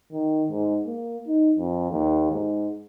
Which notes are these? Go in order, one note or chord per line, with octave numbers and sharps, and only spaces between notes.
D#3
G#2
A#3
D#4
F2
D#2
G#2